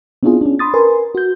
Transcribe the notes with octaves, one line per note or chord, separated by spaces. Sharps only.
B3 C4 D4 E4 F4 G#4
C#4 D4
B5 C6 D#6 A6
A#4 B4 G#5 C6
F#4 G6